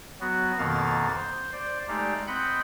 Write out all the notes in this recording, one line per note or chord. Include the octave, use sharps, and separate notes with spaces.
F#3 B3 F#4
F2 B2 D#3 A#3 F5 A6
C5
C5 D5
G#3 A3 D#4 G4 D5 F5
C4 D#5 F#5 B5 G6